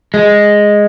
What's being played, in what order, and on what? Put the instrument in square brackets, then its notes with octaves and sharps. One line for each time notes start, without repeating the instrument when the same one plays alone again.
[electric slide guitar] G#3